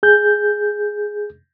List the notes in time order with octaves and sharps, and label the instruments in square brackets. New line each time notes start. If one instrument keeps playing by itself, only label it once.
[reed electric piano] G#4 G6